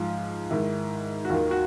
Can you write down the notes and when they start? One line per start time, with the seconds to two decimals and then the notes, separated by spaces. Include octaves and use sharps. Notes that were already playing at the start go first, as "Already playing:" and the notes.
Already playing: G#2 F3 F4
0.50 G#2 D#3 E4
1.25 F#4
1.30 D#2 F4
1.34 D#3
1.51 F#4